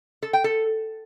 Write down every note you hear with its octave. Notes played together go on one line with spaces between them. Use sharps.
A4
G5
A4